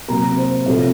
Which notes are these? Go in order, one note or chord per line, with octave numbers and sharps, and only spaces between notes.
C3 F#3 A#3 A#5
C5
F2 C3 F3 A3 C#5